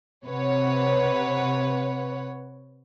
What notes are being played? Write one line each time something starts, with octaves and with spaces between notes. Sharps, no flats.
C3 B4 C#5 F#5